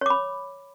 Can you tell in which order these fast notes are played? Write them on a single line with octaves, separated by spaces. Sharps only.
C#5 D6 B5